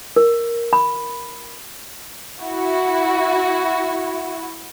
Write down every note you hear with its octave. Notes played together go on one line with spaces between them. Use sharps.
A#4
B5
E4 F#4